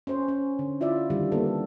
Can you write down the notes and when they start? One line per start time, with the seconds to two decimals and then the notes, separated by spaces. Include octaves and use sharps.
0.07 C#4 C5
0.28 C#4
0.59 D3
0.81 E4 F4 D5 E5
1.10 D3 D#3 G3
1.32 A#3 B3 D4 A4